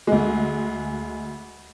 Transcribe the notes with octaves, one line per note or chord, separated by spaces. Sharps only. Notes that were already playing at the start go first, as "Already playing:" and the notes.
D2 G#3